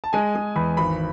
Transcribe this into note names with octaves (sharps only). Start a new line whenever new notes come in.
A5
G#3 G#5
G#3
E2 B5
G#1 B5